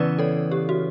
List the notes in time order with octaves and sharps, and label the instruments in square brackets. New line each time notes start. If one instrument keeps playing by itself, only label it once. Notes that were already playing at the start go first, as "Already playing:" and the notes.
Already playing: [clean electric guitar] C#3 E3 B3 [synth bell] B4 D5
[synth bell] A4 C#5
G4
F#4